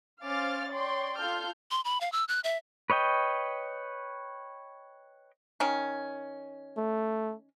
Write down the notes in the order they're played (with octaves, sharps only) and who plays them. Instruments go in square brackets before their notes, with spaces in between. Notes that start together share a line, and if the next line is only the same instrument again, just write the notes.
[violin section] C#4 C5 F5 D6 F6 A6
C#5 D5 G5 C6
F4 A4 F6 G6
[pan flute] C6
B5
F5
E6
F#6
E5
[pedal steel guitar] B4 C#5 D#5 G5
[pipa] D#3 C#4
[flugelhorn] A3